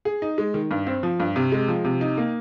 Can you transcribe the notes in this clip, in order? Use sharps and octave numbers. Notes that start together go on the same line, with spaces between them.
G#4
D#4
G#3
D#3
G2
C4
F3
G2
C3
G#3
F3
C3
D#4
A#3